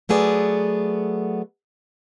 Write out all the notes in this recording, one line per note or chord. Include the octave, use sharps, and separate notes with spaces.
F#3 A3 B3 G#4 D5